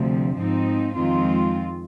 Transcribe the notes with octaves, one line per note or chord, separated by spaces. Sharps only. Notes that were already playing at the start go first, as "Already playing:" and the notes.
Already playing: D2 C3 F3
G#2 F3 C4 D#4
F2 D#3 G#3 C4 F4